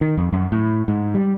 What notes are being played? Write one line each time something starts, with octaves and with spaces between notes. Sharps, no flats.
D#3
F2
F#2
A2
G#2
G3